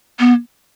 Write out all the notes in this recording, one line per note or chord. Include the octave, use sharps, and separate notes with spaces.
B3